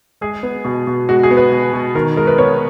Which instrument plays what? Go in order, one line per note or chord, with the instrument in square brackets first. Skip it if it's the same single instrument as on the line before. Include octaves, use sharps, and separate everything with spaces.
[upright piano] G#3 G#4
B3
B2
B2
G#3 F#4
G#4
B3
B4
B2
B2
D#3 A#4
G#3 A#4
B4
B3 C#5